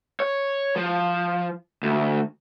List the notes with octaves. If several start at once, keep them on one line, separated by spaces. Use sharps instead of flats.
C#5
F3
D2